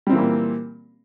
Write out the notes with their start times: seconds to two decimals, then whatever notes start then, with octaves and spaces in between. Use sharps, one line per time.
0.07 G3
0.10 C4
0.12 E3
0.15 A#3
0.18 A#2